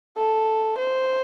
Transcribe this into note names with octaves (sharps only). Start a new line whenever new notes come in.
A4
C5